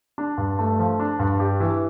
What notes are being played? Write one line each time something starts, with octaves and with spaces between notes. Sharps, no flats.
D4
G2
A3
F3
D4
G2
G4
E3